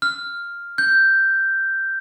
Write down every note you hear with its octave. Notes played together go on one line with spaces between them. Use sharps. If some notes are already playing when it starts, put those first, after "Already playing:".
F6
G6